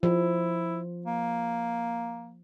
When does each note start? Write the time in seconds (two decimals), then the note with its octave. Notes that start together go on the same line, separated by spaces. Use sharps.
0.03 F3 E4
1.06 A#3